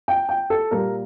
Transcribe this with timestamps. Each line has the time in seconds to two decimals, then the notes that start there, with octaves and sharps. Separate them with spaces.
0.08 G5
0.29 G5
0.50 A4
0.71 A#2 G3 A#3 A#4